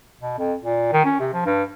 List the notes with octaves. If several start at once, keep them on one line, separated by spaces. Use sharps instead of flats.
B2
F2
A#2
D#3
C#4
C3
F3
G2